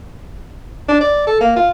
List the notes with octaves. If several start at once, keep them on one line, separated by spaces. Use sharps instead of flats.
D4
D5
A4
A#3
F4